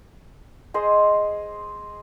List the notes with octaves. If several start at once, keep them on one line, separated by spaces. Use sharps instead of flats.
G#4 C5 D#5